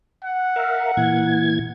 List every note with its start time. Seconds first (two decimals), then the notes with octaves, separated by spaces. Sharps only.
0.24 F#5
0.56 A#4 E5 F5
0.97 A#2 E3 G#6